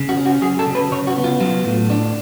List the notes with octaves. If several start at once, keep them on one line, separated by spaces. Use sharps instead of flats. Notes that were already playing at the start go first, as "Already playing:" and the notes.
Already playing: C#3
F#4
C#4
F#4
F#3 G#4
A4
C#3
B4
C#3 C#5
F#4
B3
F4
F#3 F4
A2
D4